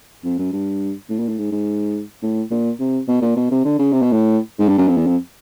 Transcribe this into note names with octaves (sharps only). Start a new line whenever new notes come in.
F2
F#2
G2
A2
A#2
A2
G#2
G#2
A2
A#2
C3
B2
A#2
B2
C3
D3
C#3
C3
B2
A2
G#2
G2
F#2
F2
E2
F2